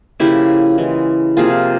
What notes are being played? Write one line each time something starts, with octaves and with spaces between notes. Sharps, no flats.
C#3 F3 A#3 E4 G4
E3 G#3
C3 F3 A#3 F4 G#4